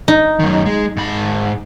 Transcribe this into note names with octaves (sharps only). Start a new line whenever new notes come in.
D#4
F#2 D#3
G#3
G#2 B5